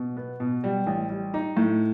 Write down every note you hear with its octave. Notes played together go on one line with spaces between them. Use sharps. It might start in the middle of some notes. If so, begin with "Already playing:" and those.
Already playing: B2
B3
B2
G3
A1
G3
D#4
A2